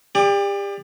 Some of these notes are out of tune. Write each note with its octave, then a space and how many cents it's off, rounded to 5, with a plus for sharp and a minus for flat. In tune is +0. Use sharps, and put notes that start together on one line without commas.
G4 +35 D5 +5